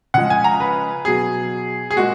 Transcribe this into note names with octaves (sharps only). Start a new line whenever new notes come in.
C#3 F3 G#3 F#5
G#5
A#5
B4
B2 F#3 G#4
G#4
A#2 G#3 F#4